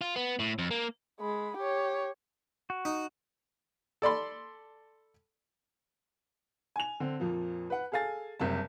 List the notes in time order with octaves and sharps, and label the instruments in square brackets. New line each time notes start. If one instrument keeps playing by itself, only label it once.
[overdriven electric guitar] F4
B3
A2
F2
A#3
[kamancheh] G#3 B5
G4 C#5
[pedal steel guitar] F#4
[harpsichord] D#4
[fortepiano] A4 D5 B5 C6
[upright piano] G#5 F7
D3 C4
F2 A#2 F3
B4 F#5
G#4 A4 F5 G#5 A6
F#1 C3 G3 A5